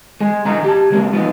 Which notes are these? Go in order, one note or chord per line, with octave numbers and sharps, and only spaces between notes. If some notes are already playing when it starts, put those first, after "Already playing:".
G#3 G#4
B1 D3 E3 G#4 D#5 A#5
G4 A5
C#3 G#3 A#3
F3 B3 D#4